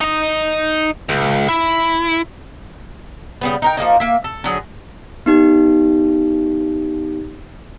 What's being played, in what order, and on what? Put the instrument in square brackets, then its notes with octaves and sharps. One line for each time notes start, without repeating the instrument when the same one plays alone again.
[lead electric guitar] D#4 D#5
C#2
E4
[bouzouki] C#3 G3 B3
D#4 A#4 G5
F3 G#3 A#3 D#4
A#3 E5
A4
D3 F#3 G#4
[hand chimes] B3 D#4 G4